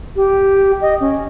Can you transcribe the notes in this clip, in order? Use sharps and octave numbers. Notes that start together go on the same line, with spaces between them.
G4
D#5
C#4